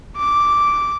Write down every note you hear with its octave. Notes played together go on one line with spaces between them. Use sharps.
D6